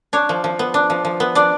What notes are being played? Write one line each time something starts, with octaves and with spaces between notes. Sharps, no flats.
D4 C#5
F3
F3
B3
D4
F3
F3
B3
D4 D5